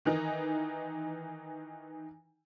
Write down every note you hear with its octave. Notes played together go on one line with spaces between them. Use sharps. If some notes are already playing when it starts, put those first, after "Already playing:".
D#3 E3 D#4